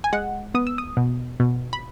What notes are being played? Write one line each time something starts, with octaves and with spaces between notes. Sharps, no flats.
G#5
G#3 F#5
B3 D#6
E6
D#6
B2
B2
B5